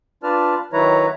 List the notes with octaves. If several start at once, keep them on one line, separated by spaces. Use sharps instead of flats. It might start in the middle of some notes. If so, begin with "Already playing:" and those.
D4 F4 B4 D5 A5 F6
D#3 F#3 E4 B4 C#5 A#5